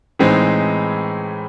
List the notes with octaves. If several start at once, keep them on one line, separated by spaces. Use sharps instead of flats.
A2 E3 G#3 C4 D#4